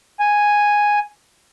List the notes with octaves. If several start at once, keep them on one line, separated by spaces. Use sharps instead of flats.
G#5